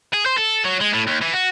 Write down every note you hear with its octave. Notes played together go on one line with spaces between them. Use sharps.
G#4
C5
A4
F#3
G#3
A2
D#2
E3
F#4